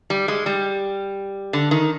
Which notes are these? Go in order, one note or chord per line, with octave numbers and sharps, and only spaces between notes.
G3
G#3
G3
D3
D#3